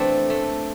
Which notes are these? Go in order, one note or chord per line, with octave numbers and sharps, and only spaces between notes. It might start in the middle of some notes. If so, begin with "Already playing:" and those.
Already playing: E2 E3 A3 C4 D4
A3